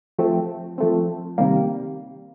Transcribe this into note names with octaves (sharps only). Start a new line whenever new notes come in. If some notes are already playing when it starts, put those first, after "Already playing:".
F3 A3 C4
F3 A3 C4
C3 D#3 G3 A#3